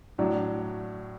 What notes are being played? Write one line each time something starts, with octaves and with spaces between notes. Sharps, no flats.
A2 F#3 D4